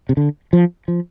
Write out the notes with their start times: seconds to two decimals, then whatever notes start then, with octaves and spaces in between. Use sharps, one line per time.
0.09 C3
0.17 D3
0.53 F3
0.88 F3